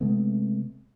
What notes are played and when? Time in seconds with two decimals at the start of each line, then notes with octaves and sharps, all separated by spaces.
0.01 C3 G#3 A3 B3